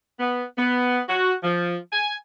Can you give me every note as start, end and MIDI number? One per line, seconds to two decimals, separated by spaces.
0.20 0.44 59
0.58 1.00 59
1.08 1.33 66
1.43 1.77 53
1.92 2.13 80